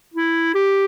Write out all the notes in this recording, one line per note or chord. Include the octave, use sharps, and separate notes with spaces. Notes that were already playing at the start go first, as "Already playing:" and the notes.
E4
G4